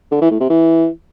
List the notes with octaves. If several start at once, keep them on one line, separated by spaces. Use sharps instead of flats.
D3
E3
A2
C3
E3